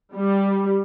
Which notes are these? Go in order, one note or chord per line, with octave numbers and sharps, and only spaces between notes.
G3